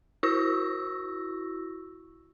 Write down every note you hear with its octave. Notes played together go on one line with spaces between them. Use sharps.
E4 F#4 C#6 E6 A#6